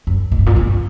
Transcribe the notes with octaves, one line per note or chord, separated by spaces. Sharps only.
F#2
A#2
G2
A#2
G2